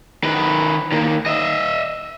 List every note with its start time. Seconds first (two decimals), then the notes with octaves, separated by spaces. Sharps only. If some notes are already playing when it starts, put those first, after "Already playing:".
0.24 D#3 B4
0.92 D#3 A#3
1.26 D#5 E5